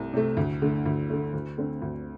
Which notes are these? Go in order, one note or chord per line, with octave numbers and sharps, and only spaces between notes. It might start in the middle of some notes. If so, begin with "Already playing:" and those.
Already playing: C2 C3 A3
C3 A3
D2
D3 A3
D2
D3 A3
D2
D3 A3 C4
D2